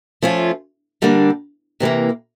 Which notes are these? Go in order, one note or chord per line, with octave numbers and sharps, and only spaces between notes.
F3 A3 C#4 F4
D3 G3 A#3 D4
C3 E3 G3 A#3